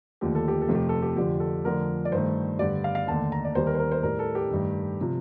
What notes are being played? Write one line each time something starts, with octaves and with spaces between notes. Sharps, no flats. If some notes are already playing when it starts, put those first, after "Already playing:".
D#2 D3 F3 A3 G4
A4
G4
A4
F2 C3 F3 A3
G4
A4
G4
F2 D3 F3 G4
A4
F2 D3 F3 A3 A#4
D5
G2 D#3 A3 C5
G2 D3 G3 D5
F5
F5
D#2 D3 A3 A5
A#5
D5
D#2 D#3 G3 C5
A#4
C5
A#4
C5
A2 G3 A#4
A4
G4
G2 D#3 A3
C3 F3